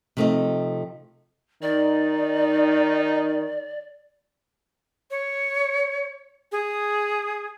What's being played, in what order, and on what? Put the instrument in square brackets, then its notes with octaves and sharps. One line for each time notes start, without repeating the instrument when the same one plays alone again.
[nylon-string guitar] C3 F3 A3 D4 D#4 D#5
[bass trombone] D#3 [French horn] D#4 [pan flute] D5
[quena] C#5
G#4